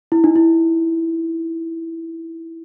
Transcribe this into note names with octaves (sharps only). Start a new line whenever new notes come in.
E4
D#4
E4